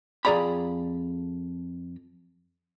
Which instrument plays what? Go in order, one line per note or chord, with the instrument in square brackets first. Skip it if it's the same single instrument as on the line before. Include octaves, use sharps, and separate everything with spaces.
[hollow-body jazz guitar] F2 G#4 D5 A#5 B5